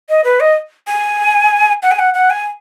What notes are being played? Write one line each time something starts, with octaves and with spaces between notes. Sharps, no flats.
D#5
B4
D#5
G#5
F#5
G#5
F#5
F#5
G#5